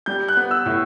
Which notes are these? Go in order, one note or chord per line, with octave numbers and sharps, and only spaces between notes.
G3 G6
F#6
B3
E6
A2